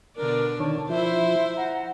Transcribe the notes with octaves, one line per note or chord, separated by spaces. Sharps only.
B2 D3 D4 A#4
D3 D#3 D4 C#5 A5
F3 E4 C5 E5
F#5 A#5